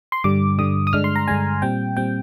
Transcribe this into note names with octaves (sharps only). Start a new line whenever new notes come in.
C6
G2 D3 G3 D6
G2 D3 G3 D#6
D#6
G2 D3 G#3 D4 F6
C6
A#5
G2 D3 G#3 D4 G#5
A#2 G3 C4 G5
A#2 G3 C4 G5